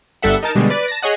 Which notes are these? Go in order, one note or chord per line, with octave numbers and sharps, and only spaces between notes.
G1 G3 A4 E5 F#5
D#4 A#4 A5
B2 D3 G3 G#3
B4 D5
A5 A#6
G#4 C#5 D#5 F#5